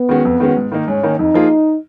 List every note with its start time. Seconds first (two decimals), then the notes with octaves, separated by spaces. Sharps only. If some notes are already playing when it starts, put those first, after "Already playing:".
Already playing: B3
0.09 D#3 G#3 C#4 F#4
0.25 F2
0.40 D#3 G#3 C#4 F#4
0.57 G#2
0.72 D#3 A#3 D#4
0.87 G#2 C#4
1.03 D#3 A#3 D#4
1.19 F2 D#4
1.34 F3 A#3 F4 G#4